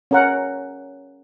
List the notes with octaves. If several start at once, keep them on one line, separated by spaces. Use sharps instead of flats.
C#4 A#4 F#5